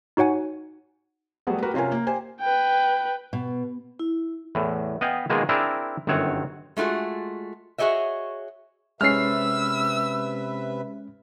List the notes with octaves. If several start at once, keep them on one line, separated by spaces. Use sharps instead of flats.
D#4 F#4 C#5 F#5 G#5
F#3 G3 A3 B3 F#4 G#4
F#4 G4 A#4 B4
C3 C#4 F4 A#4 G#5
A#3
G4 C5 G#5
B4 G5
B2
E4
E2 A2
B3 B4 D#5 F5 G5 G#5
B2 D#3 G#3 A#3 F4 G#4
C4 D4 E4 G#4 A#4
G1 F#2 D#3 C4 C#5 F#5
G#3 A3 F4 F#4 G#4
F#4 G#4 C#5 D#5 E5
C3 G#3 C#4 B4 E5 E6 F6 C7